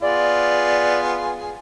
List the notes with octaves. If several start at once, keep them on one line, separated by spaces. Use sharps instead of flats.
B3 F4 G#4 D5